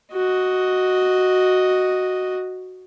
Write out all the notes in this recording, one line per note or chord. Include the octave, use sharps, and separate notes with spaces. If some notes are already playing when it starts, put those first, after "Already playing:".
F#4 D#5